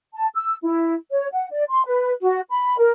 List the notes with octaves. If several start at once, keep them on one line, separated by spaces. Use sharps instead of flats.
A5
E6
E4
C#5
F#5
D5
C6
B4
F#4
B5
A#4